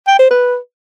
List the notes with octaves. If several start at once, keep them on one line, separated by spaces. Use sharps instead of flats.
G5
C5
B4